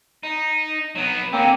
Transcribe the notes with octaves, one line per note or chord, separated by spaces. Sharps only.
D#4
F#3 B3
D3 A#3 C4 C#4